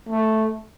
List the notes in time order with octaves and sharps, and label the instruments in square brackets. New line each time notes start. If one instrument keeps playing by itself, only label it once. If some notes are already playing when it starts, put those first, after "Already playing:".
[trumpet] A3